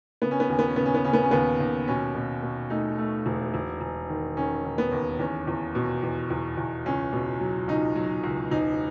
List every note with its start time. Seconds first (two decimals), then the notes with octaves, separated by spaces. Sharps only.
0.22 C#3 B3
0.31 C#4
0.40 B3
0.49 D#2 C#4
0.59 B3
0.68 C#4
0.76 C#3 B3
0.85 C#4
0.95 B3
1.04 C#3 C#4
1.13 B3
1.23 C#4
1.31 D#2 B3
1.60 D#2
1.88 B2 C#4
2.15 B2
2.43 B2
2.70 A3 D#4
2.98 A3
3.26 E1
3.54 E1
3.81 E1
4.09 D#3
4.37 D#3 C#4
4.64 D#3
4.78 B3
4.92 D#2
5.19 E2 C#4
5.47 E2
5.75 B2
6.02 E2
6.30 E2
6.57 E2
6.86 C#2 C#4
7.13 B2
7.40 F#3
7.68 C#2 D#4
7.96 F#3
8.24 C#2
8.51 E1 D#4